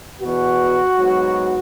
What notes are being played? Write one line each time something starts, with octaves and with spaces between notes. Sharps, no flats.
E2 B2 B3 F#4
G#2 F#3 B3